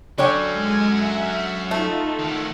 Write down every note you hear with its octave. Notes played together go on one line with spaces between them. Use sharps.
D3 F#3 C#4 C#5 G5
G#3 G#5 G#6
E5 F#5
A3 D#4 F4 A4
A2 D#3 F#5